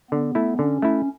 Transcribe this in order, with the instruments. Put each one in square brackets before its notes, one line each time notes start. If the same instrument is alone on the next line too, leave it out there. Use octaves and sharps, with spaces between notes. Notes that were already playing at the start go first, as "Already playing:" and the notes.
[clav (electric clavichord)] D3 [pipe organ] B3
[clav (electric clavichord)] A3 E4
[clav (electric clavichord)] D3 [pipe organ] C#4
[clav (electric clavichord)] A3 E4